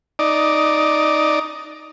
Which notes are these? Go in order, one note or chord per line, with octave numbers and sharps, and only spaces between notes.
D#4 D5